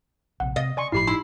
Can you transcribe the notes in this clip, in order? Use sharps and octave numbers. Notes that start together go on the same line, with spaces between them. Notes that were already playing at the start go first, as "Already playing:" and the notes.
A#1 C3 F#5
C3 D#5 F5 A6
C#3 D5 G#5 C6 C#6
G1 A2 F3 E4 G4 B5 C7
D#4 E4 B5 C6